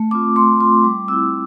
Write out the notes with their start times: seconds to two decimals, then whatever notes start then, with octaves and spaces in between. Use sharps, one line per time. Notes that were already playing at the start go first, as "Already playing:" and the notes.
Already playing: A3
0.11 C4 F4 D6
0.36 A3 C6
0.60 C4 F4 C6
0.84 G3 D6
1.08 C4 E4 E6